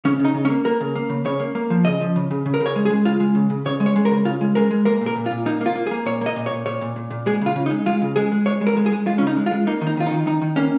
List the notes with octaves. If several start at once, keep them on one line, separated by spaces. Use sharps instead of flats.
C#3 C#4
C#3
D#4
C#3
C#4
A#3
A#3 A#4
C#3
A#3
C#3
C#3 C#5
A#3
A#3
F3
C#3 D#5
F3
C#3
C#3
C#3
A#4
C#3
C#5
G#3
G#4
G#3
C#3 F4
G#3
C#3
C#3
C#3 C#5
G#3
C#5
G#3
A#4
C#3
C#3 F4
G#3
G#3 A#4
G#3
A#3 A#4
A#2
A#4
A#2
F4
A#2
A#3 D#4
A#3 F4
A#3
G#4
A#3
A#2 C#5
A#3 D#5
A#2
C#5
A#2
A#2 C#5
A#2
A#2
A#2
G#3 G#4
C#3 F4
C#3
D#4
G#3
G#3 F4
C#3
G#3 G#4
G#3
G#3 C#5
G#3
A#4
G#3
G#4
G#3
G#3 F4
C#4
C#3 D#4
G#3
F4
G#3
A#3 D#4
D#3
D#4
D#3 F4
D#4
D#3
D#3 D#4
D#3
A#3 C#4